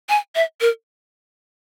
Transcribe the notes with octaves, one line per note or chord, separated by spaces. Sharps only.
G#5
E5
A#4